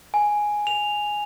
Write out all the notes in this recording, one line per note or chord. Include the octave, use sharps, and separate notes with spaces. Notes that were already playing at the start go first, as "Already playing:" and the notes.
G#5
F7